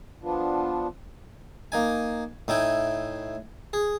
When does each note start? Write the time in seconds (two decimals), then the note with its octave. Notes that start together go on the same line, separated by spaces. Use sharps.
0.23 F3 B3 D4 F4
1.72 A#3 D#4 G#5
2.48 A2 D#4 E4 G5 G#5
3.73 G#4